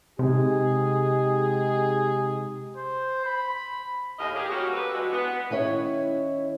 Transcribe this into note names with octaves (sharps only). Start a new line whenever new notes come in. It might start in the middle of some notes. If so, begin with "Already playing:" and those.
C3 G#3 D#4 G4 G#4
C5
B5
D#2 A2 A#4 D#5
G4 G#4
G3 A#3 C#4 F#4
C#4 G4 A4 B4
E3 G#3 D4 F#4
B3
D#3 C#4 E4 C#5